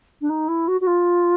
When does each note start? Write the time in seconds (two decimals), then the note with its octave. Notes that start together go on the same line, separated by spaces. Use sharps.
0.21 D4
0.29 D#4
0.48 E4
0.68 F#4
0.81 F#4
0.87 F4